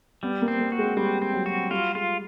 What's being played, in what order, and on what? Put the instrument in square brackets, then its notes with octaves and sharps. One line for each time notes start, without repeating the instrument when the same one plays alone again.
[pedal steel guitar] G3 [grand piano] B3
[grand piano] A#3
[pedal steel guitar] C4
[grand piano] A#3
[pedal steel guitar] F#4
[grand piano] G#3
[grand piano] G3 [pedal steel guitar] C4
[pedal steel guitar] C4
[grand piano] F#3
[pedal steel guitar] F#4
[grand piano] G3 [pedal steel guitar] F4
[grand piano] G#3 [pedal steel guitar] F4